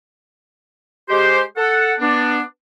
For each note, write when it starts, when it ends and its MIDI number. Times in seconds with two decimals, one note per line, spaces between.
1.09 1.41 56
1.09 1.41 67
1.09 1.41 72
1.57 1.94 69
1.57 1.94 78
2.00 2.40 59
2.00 2.40 62